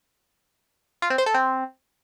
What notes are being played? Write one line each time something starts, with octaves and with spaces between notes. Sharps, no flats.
F4
C4
C5
A4
C4